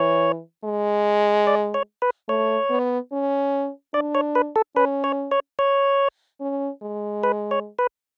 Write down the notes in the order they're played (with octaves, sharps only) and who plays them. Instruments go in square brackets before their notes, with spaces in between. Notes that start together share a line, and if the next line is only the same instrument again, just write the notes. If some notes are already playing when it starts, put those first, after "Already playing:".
Already playing: [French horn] E3 [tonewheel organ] C#5
[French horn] G#3
[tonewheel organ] D5
C#5
B4
[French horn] A3 [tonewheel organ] C#5
[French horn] B3
C#4
[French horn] D4 [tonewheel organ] D5
[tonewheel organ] C#5
B4
A4
[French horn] C#4 [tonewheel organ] B4
[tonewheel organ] C#5
C#5
C#5
[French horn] C#4
G#3
[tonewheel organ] B4
C#5
B4